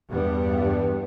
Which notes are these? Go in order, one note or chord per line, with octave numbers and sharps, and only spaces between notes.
E2 G2 G3 B3